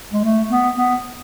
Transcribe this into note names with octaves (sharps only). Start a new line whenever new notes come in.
G#3
A3
B3
B3